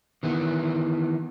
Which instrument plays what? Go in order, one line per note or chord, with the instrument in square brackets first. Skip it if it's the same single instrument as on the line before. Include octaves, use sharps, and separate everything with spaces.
[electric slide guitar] D#3 E3 B3